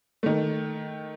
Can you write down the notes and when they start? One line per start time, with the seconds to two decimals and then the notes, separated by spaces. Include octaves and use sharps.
0.23 D#3 A3